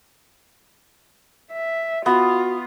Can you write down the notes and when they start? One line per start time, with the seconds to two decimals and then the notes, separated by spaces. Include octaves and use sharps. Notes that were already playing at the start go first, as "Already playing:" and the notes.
1.52 E5
2.06 B3 F4 F#4